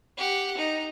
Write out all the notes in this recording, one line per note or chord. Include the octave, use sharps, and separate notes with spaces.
G4 F#5
D#4